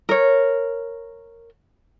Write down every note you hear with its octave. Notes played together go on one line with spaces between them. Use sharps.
A#4 C#5